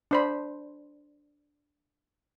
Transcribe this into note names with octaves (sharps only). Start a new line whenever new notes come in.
D4 C5 B5